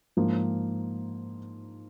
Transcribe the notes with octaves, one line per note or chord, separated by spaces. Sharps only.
G#2 F3 A#3